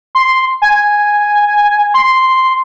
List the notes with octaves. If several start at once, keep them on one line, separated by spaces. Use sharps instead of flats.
C6
G#5
C6